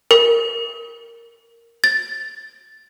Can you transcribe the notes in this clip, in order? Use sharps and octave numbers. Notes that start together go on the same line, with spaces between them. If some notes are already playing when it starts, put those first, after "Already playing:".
A#4
A6